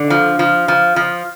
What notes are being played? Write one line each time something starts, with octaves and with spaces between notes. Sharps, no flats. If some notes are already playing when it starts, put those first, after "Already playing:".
Already playing: D3
F3
F3
F3
F3